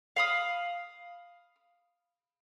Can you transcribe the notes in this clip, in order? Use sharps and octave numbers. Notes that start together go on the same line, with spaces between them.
F5 B5 D#6